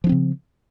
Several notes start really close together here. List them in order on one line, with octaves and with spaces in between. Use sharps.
F3 D4 C4 C#3